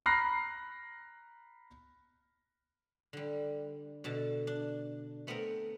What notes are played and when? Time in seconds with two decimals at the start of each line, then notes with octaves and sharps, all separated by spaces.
0.06 A#5 B5 F6 F#6 A#6 C7
3.13 D3 G3
4.04 B2 D3 A5
4.47 D4
5.27 A3 B3 C4 A4 A#4